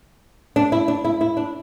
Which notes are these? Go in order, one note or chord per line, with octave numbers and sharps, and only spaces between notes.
D4
E4
D4
E4
E4
D4